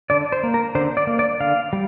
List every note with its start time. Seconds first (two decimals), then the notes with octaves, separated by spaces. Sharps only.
0.10 D3 D5
0.32 C5
0.43 A#3
0.54 A#4
0.75 D3 C5
0.97 D5
1.07 A#3
1.19 D5
1.40 D3 F5
1.73 G3